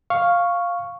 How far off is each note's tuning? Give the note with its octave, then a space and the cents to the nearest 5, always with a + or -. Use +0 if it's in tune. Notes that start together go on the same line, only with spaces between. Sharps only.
F5 +0 C#6 +0